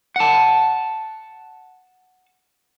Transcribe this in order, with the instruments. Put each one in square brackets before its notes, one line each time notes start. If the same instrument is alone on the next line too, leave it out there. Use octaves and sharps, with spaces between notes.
[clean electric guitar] F#5 A5